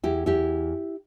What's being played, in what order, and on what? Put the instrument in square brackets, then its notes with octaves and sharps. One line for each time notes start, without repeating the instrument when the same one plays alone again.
[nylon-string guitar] E2 E4 G4
E2 E4 G4